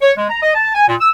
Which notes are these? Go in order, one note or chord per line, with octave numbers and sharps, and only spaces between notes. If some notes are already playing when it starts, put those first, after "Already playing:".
C#5
G#3
A#5
D#5
A5
G#5
A#2
E6